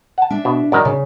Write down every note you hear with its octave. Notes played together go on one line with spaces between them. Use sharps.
F#5 A5
D4 E5
B2
F#2 D#3 D5 A#5
C#3